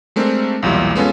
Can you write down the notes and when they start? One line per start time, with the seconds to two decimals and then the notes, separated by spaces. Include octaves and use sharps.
0.16 G#3 A3 C4 D4 A#4
0.63 B1 E2 A#2 G3 E4
0.96 G#3 B3 C#4 F4 A4